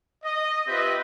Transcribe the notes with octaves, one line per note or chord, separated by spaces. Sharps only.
D#5
C4 F4 G4 B4 D#5 E5